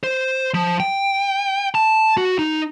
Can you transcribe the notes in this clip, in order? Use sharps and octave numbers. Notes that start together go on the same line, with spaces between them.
C5
F3
G5
A5
F#4
D#4